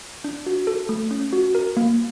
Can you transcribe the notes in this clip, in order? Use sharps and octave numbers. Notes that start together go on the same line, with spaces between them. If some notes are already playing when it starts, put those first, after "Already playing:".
D4
F#4
A4
A3
C#4
F#4
A#4
A#3